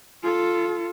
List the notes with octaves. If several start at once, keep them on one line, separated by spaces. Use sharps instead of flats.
F4 A4